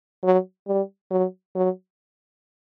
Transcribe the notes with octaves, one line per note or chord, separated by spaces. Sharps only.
F#3
G3
F#3
F#3